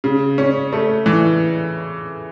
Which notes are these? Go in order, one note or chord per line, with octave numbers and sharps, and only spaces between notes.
C#3
C#4
A3
E3